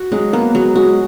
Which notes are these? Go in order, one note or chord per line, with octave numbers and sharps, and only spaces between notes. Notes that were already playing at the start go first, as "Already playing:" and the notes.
Already playing: F#4
F#3 G#3
A#3 B3
F#3 G#3
G#3 F#4